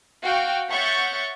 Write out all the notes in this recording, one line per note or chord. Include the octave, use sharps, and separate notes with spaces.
F#4 F5 G5
C#5 E5 F#5 C#6 G6 A6